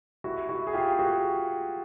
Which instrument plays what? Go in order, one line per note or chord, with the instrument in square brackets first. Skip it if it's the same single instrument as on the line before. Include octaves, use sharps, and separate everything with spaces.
[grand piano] E4 F#4
E4 F#4
G#4
F4 G4
F#4 G#4